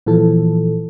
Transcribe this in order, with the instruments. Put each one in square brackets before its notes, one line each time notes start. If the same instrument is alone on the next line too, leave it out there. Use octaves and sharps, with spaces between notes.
[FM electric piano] A#2 E3 F3 A4